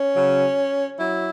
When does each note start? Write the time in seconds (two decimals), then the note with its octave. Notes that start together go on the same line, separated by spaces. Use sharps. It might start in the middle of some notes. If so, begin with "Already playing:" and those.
Already playing: C#4
0.16 C#3 F#3
0.99 F#3 E4